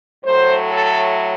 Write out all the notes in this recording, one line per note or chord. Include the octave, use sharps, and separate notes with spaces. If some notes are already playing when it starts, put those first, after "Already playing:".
A2 F#3 A3 C5
A4